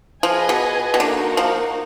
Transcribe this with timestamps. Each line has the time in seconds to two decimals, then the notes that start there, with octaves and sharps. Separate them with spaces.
0.23 F3 G#4 B4 D#5 G#5
0.49 B2
0.94 B2
1.00 D3 A#3 D#4 F#4 A#4
1.37 F3